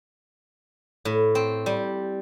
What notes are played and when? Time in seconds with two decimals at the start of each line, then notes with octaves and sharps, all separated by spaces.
1.05 A2
1.35 C4
1.66 G3